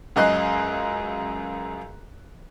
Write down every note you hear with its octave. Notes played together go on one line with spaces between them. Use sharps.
C#2 F#2 D#5 F#6 C7